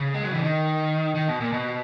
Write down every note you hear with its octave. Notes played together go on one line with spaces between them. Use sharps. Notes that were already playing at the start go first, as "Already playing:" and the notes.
Already playing: C#3
G#3
F#3
E3
D#3
D#3
B2
A#2
B2